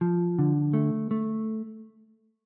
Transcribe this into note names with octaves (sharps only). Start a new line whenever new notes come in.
F3
D3
A3
A3